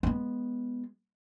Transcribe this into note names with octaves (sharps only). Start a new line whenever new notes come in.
G#3 B3